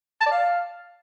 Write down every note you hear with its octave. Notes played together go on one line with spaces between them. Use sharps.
A5
D5
F5